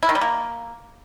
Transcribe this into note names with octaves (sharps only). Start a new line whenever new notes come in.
E4
D#3
G3
A#3